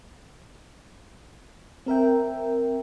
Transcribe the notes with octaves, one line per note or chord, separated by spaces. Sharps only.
C4 A#4 E5 G5